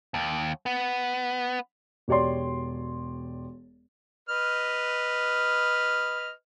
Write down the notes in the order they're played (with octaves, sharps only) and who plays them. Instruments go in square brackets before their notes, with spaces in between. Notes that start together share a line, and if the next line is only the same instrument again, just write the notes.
[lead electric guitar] D#2
B3
[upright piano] E1 G4 C#5 D5 C6
[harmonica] B4 D#5 F6